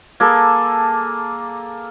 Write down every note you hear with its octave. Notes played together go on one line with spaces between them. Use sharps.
A#3 G#4 A4